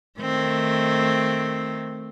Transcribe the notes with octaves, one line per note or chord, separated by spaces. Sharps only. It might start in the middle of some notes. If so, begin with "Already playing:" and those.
D#3 A3 C4